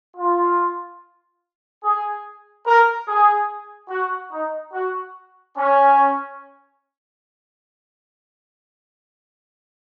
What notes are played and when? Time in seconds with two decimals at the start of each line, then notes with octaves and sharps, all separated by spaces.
0.16 F4
1.82 G#4
2.65 A#4
3.07 G#4
3.89 F#4
4.31 D#4
4.73 F#4
5.56 C#4